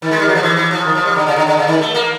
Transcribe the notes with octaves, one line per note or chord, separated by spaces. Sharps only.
D#3
G#3
G3
F#3
F3
E3
E3
F3
D#3
F3
G3
D3
C#3
D3
D3
C#3
D#3
A3
A#3